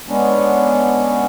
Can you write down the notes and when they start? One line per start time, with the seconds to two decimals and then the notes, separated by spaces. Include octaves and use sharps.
0.08 G#3 B3 C#4 D4